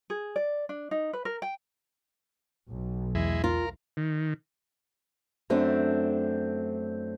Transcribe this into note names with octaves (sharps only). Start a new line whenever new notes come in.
G#4
D5
D4
D#4
B4
A#4
G5
B1
E2 G#3 E4
F4 A#4
D#3
F#2 A3 C4 D4